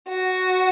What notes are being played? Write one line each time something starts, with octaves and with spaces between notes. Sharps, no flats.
F#4